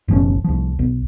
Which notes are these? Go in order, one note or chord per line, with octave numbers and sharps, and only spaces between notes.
F#1 B1 F3 C#4
C2 F3
B1